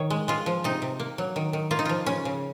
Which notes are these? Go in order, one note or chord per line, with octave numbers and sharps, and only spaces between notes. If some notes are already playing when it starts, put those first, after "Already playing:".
Already playing: D#3 C#5
G#3
G#3 F4
F3
C3 D#4
C3
A#3
F#3
D#3
D#3
A#3 F4
D#4
F3 F4
C#3 C#4
C#3